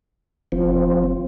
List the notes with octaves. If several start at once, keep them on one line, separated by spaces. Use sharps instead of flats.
F#1 F3 C4